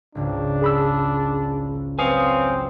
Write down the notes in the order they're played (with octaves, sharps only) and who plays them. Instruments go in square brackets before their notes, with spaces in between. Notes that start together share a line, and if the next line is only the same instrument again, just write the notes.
[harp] G#1 C#2 [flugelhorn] D4
[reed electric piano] G#4 B5 E6
[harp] F#3 [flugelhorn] C4 [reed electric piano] B4 D#6 [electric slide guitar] C#5 F5 G#5